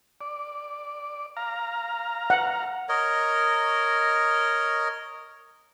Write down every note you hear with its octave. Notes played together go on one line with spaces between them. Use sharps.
D5
F5 A#5
F#5
A#4 C#5 D#5